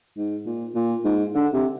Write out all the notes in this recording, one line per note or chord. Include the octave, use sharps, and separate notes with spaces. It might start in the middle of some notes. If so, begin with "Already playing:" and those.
G#2
A#2
A#2
G#2
D3
C3